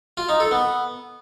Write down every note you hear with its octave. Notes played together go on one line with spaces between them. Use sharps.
F4
D#4
A4
B3